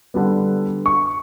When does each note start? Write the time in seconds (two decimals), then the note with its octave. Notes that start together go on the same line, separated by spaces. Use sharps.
0.14 D3 G3 B3
0.86 C#6